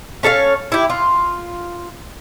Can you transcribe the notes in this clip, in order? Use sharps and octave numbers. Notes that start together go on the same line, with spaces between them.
C#4 A4 C#5 F5
E4 G4
F4